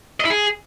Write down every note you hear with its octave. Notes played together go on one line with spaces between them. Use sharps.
D#5
E4
G#4